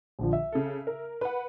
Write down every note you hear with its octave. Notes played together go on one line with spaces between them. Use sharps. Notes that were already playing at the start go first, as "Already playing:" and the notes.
A#1 D3 F3
E5
C#3 A4
A#4
B4 F#5